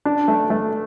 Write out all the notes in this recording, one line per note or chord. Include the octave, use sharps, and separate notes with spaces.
D4
A3
A3